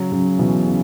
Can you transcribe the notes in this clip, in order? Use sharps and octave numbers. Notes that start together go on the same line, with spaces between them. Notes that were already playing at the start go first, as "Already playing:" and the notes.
Already playing: C#3 F#3
C#3 F#3
B2 E3
C#3